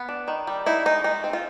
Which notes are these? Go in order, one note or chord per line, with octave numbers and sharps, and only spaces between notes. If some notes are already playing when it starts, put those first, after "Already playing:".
Already playing: B3
D4
D#3
G3
D#4 E4
G#3 D#4
G#3 D#4
C4
F4